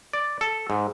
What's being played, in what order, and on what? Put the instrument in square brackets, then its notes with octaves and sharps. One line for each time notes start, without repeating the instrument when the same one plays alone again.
[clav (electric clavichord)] D5
A4
G#2